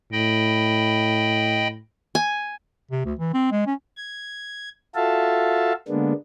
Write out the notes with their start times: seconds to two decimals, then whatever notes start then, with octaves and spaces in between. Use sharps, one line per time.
0.12 A2 D#5 G5 B5
2.15 G#5
2.91 C3
3.05 D2
3.19 E3
3.34 C4
3.51 G#3
3.66 C#4
3.97 G#6
4.95 F4 F#4 A4 E5 F5 A5
5.88 D3 G#3 A#3 B3 D4